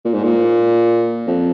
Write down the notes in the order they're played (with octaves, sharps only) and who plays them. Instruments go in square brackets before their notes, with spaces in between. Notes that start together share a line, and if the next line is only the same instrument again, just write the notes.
[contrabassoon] A#2
G#2
A#2
F2